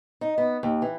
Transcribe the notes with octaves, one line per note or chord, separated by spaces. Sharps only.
D#4
B3
D#2
E3